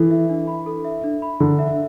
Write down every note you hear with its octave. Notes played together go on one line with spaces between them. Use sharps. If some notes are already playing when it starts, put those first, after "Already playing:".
Already playing: E3 A4
E5
D4
B5
A4
E5
D4
B5
D3 A4
E5